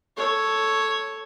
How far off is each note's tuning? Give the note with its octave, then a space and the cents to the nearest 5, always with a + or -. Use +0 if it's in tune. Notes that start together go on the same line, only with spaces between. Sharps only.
A4 +0 C#5 +0